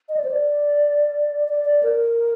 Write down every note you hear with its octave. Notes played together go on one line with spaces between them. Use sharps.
D#5
D5
C5
D5
D5
D5
A#4